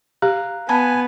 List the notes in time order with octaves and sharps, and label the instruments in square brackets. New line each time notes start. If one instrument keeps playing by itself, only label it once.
[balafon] G4 [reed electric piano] F5 A#5 F#6
[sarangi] B3 [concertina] G#5 [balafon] A5 B5